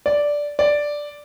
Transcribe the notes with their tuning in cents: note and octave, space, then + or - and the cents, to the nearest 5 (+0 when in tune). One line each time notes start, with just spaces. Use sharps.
D5 -5
D5 +0